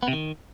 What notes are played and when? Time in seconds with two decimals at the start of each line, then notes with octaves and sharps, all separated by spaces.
0.03 B3
0.08 C3
0.13 D#3